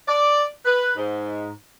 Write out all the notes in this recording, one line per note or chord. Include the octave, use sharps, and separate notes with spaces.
D5
B4
G#2